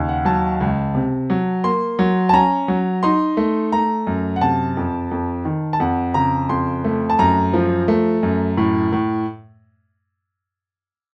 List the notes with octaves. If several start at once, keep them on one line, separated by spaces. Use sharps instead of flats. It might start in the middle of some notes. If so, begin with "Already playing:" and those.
Already playing: D#2 C#3
F#5
F#3 A5
C#2
C3
F#3
A#3 C6
F#3
A5
C#4 A#5
F#3
D#4 C6
A3
A3 A#5
F#2
F#5
C3 A5
F2
F2
D#3
A5
F2 F#5
C#3 A#5
F2 C6
A3
A5
F#2 A#5
F3
A3
F#2
A2
A2